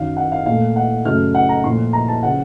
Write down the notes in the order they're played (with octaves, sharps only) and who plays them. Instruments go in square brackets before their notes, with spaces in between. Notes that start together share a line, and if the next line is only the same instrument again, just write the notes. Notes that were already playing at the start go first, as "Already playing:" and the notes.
Already playing: [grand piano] F#2 D#3 F#3 F5
F#5
F5
A#2 A3 F5
F#5
F#2 C#3 F#3 A3 F6
F#5
A#5
A#2 F3 A3 C6
A#5
A5
C#3 F3 F#5